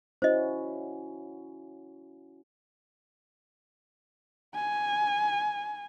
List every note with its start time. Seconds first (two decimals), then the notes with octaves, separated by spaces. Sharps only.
0.22 C#4 E4 F#4 C5 D#5
4.55 G#5